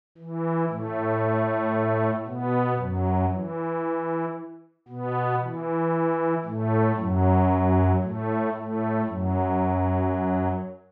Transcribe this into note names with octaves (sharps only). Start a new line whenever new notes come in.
E3
A2 A3
B2 B3
F#2 F#3
E3
B2 B3
E3
A2 A3
F#2 F#3
A2 A3
A2 A3
F#2 F#3